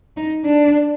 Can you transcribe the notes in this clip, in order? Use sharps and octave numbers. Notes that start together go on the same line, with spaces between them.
D#4
D4